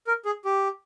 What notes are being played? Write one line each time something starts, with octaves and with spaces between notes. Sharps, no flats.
A#4
G#4
G4